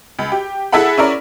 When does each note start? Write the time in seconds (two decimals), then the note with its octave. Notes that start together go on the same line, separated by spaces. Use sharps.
0.19 C#2
0.32 G4
0.72 E4 G#4 A4 E5 F#5 B5
0.98 C#4 E4 A#4 D5